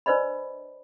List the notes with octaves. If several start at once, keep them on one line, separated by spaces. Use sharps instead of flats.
D4 B4 C5 D5 D#5 B5